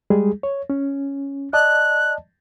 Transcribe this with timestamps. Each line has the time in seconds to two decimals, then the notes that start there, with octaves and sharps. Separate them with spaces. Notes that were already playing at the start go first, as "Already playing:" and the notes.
0.10 G3 G#3 G#4
0.43 C#5
0.70 C#4
1.53 D5 D#5 A5 F#6